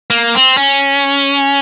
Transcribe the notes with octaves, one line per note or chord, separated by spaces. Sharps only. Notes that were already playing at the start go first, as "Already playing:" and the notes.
A#3
C4
C#4